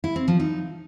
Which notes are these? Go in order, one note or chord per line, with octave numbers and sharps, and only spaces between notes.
E4
C4
F3
D#4